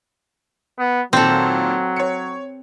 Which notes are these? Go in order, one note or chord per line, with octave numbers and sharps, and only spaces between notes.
B3
A#2 D#3 F#3 C4 A4
C#5 C#7